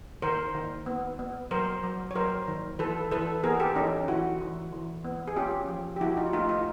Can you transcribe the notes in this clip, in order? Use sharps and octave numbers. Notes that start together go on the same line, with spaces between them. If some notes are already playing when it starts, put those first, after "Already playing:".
D#3 A#4 C5
D#3
B3
B3
F#3 A#4 C5
F#3
C#5
F#3 A#4 C5
D#3
E3 A4 B4
E3 A4 B4
B3 G#4 A#4
G4 A4
E3 C#4 D#4
E3 E4 F#4
E3
E3
B3
G#4
C#4 F4 G4
F3
G4
F3 E4 F#4
D#4 F4
A3 D#4 F4
D#4 F4